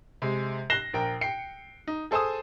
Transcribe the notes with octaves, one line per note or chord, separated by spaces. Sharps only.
C3 G#3
F#6 A#6 C7 E7 G7
A#1 A#4 G5
G5 C7 C#7
D#4
G#4 A4 C5 G#5 A5 D#6